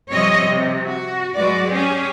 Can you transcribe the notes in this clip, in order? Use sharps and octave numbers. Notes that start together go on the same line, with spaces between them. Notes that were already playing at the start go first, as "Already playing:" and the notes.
C3 F3 G3 C4 C#5 D#5
C3
F#4
F#3 G#3 F#4 B4 D5
C#4 G4 G#4